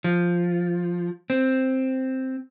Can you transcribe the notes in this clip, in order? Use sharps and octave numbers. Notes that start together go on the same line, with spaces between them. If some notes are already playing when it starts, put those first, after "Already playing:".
F3
C4